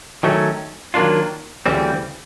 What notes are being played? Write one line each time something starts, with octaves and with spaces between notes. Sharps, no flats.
D#3 F#3 A3 C#4
D#3 F#3 A#3 D4 F4
D2 C#3 E3 G3 C4